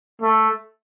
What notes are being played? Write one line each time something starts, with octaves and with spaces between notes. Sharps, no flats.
A3